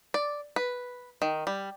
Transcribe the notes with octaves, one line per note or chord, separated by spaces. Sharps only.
D5
B4
D#3
G3